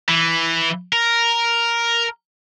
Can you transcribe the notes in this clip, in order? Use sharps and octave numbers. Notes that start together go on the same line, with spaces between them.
E3
A#4